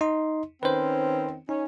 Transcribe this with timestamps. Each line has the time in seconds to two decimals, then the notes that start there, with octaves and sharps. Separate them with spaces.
0.01 D#4 D#5 C6
0.63 D#3 C4 C#4 B4 C5
1.49 C#4 D#4